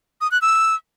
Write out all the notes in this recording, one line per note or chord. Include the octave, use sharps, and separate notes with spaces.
D#6
F#6
E6